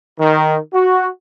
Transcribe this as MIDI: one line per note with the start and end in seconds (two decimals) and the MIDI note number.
0.19 0.56 51
0.72 1.07 66